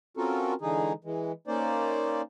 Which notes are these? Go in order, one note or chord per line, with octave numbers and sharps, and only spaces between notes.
C4 C#4 F4 F#4 A4 A#4
D3 E3 G#3 D#4 G#4
E3 G#3
A#3 C#4 D#4 C5 D5